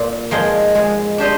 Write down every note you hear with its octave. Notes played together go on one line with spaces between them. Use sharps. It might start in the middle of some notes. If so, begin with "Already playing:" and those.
Already playing: A#2
F3 G#3 D#4 A#4
G#3
D4 G4 C5 D#5